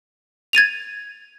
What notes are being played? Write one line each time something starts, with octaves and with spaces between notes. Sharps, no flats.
G#6 A6 D#7 F7